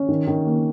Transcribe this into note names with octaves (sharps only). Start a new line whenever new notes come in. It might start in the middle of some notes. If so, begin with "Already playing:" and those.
Already playing: C#4
D#3
D#3
A#3